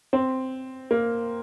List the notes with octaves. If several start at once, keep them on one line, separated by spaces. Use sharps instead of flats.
C4
A#3